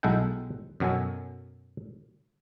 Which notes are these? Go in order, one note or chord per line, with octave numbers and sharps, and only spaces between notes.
B1 G#3 E4 A4 F#5 G5
F#2 B2 F#3 A4 G#5